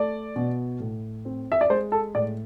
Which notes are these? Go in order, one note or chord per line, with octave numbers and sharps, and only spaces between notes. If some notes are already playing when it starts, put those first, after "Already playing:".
Already playing: A3 D5
B2
A2
C4
E5
D5
G#3 C5
A4
A2 D5